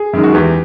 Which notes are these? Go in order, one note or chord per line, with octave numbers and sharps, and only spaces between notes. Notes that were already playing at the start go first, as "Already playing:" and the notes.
Already playing: G#4
F#2 D#3 G#3
F#4
E2 G4